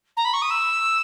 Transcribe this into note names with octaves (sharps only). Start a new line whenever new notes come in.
A#5
B5
C#6
D#6
E6